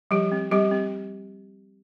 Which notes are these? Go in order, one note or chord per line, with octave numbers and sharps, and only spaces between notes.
F3 G3 G4
C4
G3 C4 G4
C4